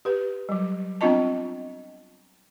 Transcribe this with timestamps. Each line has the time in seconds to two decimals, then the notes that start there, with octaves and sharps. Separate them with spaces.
0.05 G4 B4
0.49 F#3 G3
1.01 B3 C4 D4 F4 D#5 A5